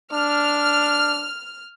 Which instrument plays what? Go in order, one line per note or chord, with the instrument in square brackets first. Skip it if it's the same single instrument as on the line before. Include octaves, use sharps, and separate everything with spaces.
[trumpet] D4 [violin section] F6